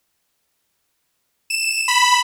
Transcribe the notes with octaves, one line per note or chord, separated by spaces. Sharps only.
E7
B5